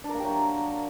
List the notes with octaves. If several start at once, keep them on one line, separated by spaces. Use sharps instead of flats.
D4
A#4
A#3
G4
F#3